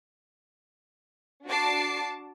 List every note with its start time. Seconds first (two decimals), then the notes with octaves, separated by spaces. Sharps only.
1.47 D4 F#4 A5 D6 C7